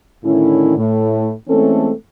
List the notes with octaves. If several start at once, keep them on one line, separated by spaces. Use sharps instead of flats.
A2 D3 D#3 C#4 E4
A2
E3 G#3 A3 C4 C#4 A4